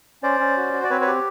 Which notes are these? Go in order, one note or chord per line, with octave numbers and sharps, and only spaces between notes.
C#4 C5 D5
C#4
F#4
F#4
D5
C4 B4 C#5
B4 C#5
G4